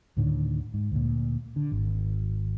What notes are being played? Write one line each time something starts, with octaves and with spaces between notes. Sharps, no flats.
D2 A2 D3 D#3
G#2
D2 A#2
D3
G#1